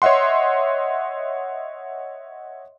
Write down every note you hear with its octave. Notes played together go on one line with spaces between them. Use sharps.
C#5 D#5 E5 F#5 C6